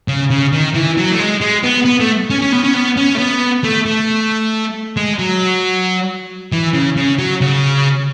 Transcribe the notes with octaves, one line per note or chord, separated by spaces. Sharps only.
C#3
C#3
D#3
E3
F#3
A3
G#3
G#3
B3
B3
A3
C#4
C#4
B3
C#4
B3
C#4
A3
B3
A3
A3
G#3
F#3
E3
C#3
C#3
F#3
C#3